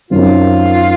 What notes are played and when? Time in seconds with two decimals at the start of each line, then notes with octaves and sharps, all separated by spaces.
0.10 F#2 D#3 F#3 C4 F4